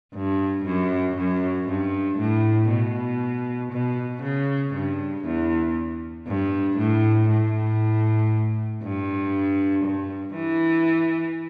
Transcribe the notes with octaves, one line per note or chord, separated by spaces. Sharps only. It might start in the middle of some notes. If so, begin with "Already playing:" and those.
G2
F#2
F#2
G2
A2
B2
B2
C#3
G2
E2
G2
A2
A2
G2
G2
E3